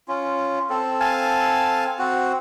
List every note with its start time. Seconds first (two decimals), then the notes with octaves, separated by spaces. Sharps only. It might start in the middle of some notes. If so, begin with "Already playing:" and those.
0.08 C#4 F4
0.70 C4 A4
1.00 F5 G#5 A5
1.99 C4 F#4